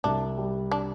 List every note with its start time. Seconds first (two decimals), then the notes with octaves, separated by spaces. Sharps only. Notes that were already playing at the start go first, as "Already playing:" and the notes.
0.04 C2 D4
0.37 G3
0.72 D4